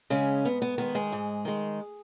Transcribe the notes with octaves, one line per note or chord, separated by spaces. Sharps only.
C#3 G#3 C#4
G#2 B3
B3
D#3 G#3 B3
G#3 G#4
G#2
D#3 G#3